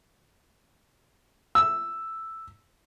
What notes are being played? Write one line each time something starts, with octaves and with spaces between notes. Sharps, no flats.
E6